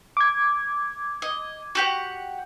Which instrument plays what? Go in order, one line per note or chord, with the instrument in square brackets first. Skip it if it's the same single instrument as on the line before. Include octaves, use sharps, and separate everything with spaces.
[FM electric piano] D6 G#6
[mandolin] D#5
F#4 G4 F#5